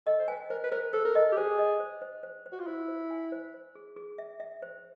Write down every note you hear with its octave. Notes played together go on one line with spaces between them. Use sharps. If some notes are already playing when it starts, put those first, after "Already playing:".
A4 D#5
C5
B4 G#5
A#4 C5
B4
A#4 C5
A4 C5
A#4
A4 D#5
G4
G#4 C5
D#5
C5
C5
C5
C5
F#4
F4
E4 C5
C5
G#5
C5
C5
G#4
G#4
E5
E5
C5